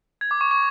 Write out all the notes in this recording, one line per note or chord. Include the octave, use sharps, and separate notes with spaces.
G#6
D6
C#6
C#6